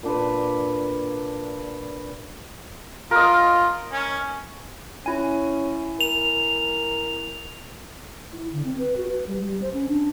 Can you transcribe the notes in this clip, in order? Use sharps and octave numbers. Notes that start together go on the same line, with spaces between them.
A#2 D4 B4
F4 A#4 D#5
C#4
C#4 E4 G#5
A#4 F7
E4
D3
C4
B4
F#4
B4
G3
G3
C5
C#4
D4